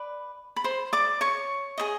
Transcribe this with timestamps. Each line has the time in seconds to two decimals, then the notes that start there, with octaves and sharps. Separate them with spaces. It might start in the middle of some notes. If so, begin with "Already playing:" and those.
Already playing: B4 D5
0.56 B5
0.64 C5 C6
0.93 D5 D6
1.21 C#5 C#6
1.78 G#4 C5 D#5